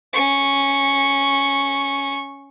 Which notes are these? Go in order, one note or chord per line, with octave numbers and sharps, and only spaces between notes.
C#4 C#6